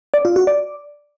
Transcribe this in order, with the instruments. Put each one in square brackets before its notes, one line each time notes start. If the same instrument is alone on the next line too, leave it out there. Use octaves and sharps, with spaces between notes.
[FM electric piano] D5
F4
F#4
D5